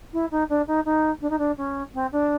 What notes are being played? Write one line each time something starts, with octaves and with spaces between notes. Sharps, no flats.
E4
D#4
D4
D#4
D#4
D4
D#4
D4
C#4
C4
D4